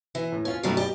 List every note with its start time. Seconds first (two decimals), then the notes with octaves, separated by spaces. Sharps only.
0.15 E3 E5
0.32 A2
0.45 C#4 F4 C#5
0.63 F#2 B2 D#3 F3 G3 A3
0.77 G4 D5 D#5 B5